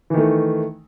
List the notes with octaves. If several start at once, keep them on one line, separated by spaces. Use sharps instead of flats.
D#3 E3 A3